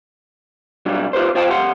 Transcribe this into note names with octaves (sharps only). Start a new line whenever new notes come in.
B2 F#3 G3 B3 D4
F4 G4 B4 C5
B1 F4 C5 G5 A5
F#2 G4 F#5 C6